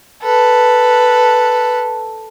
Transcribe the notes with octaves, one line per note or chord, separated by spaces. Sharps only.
A4 B4